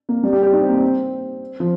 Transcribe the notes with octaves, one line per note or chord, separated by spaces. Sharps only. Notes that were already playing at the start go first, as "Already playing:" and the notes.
A#3
G3
G4
G4
D#4
C4
A#3
C4
F3